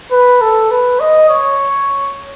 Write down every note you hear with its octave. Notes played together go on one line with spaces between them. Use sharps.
B4
A4
B4
D#5
C#5